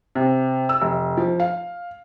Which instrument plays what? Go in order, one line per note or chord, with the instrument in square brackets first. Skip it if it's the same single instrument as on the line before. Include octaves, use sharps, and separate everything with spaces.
[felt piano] C3
E6
F1
F3
F5